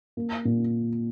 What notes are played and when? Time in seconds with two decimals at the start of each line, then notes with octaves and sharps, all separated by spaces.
0.17 A#3
0.45 A#2